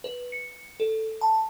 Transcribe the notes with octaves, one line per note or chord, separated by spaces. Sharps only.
B4
C#7
A4
A5